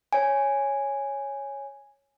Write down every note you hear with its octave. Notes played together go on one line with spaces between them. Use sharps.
C#5 G#5